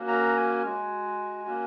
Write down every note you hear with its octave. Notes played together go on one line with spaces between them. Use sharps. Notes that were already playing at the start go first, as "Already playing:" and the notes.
Already playing: A#3 C#4 F#4
A#5
G#5
G#3 F#4
A#3 C#4 F#4